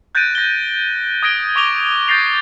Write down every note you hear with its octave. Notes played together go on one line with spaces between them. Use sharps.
F#6 G6 A6 A#6 D7 D#7
A#6 G7
D#6 G#6 A#6 D7 G7
C#6 D6 A#6 F7 G7
G6 A6 A#6 C7 F7